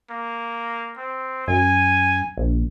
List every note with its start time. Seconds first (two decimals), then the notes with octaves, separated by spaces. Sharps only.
0.10 A#3
0.97 C4
1.48 F#2 G#5
2.37 A#1